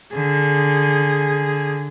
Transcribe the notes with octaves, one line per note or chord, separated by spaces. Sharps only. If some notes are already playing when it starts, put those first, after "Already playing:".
D3 G#4